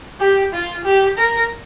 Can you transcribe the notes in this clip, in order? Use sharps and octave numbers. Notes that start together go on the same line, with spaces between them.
G4
F4
G4
A#4